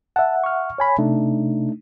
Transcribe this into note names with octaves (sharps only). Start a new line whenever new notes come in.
E5 F#5 A5
C#6 F6
C#5 G#5 B5
C3 A3 D4 D#4